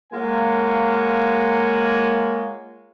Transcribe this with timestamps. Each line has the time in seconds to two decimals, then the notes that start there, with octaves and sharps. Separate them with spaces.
0.13 G#3 A#3 F4 C#5 F#5 G#5